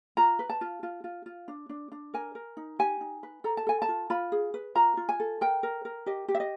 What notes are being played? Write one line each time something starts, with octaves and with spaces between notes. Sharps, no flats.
F4 A#5
B4
A5
F4
F4
F4
F4
D4
D4
D4
A#4 G#5
A#4
D#4
G4 G#5
D#4
B4
A4 A#5
A5
A4 G#5
A5
F4
F4 B5
G#4
B4
F4 A#5
F4
G#5
A4
A#4 G5
A#4
A#4
G4 D#5
G4
E5
D#5